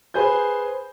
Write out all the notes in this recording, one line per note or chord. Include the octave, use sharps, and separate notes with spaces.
G#4 B4 C5 G#5 G6